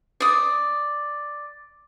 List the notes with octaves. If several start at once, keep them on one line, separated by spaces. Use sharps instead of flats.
D5 D#6